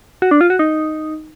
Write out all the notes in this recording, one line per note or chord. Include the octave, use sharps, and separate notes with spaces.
F#4
D4
F4
F#4
D#4